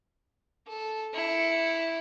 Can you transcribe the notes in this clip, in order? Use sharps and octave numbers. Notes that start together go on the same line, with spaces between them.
A4
E4 C#7